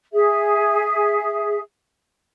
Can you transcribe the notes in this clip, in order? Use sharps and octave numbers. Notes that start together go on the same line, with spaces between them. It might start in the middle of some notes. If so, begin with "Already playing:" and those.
G#4 E5